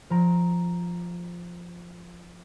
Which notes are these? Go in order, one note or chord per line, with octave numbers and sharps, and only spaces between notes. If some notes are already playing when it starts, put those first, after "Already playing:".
F3 A#5 D7